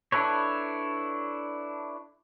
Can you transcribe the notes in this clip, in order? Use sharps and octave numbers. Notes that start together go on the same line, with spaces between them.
D4 E4 A4 B4 C#5